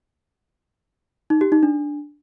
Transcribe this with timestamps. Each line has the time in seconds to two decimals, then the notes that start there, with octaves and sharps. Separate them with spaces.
1.30 D#4
1.41 G4
1.52 D#4
1.63 D4